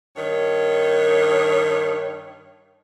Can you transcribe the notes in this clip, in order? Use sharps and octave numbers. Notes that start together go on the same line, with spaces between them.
G2 D#3 C#5